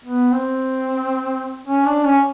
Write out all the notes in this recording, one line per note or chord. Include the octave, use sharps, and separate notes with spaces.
B3
C4
C#4
D4
C#4